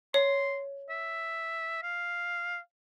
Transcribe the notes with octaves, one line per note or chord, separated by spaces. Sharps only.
C#5 C6
E5
F5